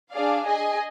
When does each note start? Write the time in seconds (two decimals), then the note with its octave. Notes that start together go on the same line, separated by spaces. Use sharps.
0.12 D4 G#4 D5 F5
0.45 G#4 D#5 G#5